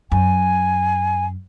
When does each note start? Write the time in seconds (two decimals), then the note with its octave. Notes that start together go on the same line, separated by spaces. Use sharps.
0.12 F#2 G#5